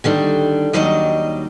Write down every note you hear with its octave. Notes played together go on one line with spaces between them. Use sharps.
D3 D#3 G3 D4
D#2 D#3 F#3 G3 D4 D#5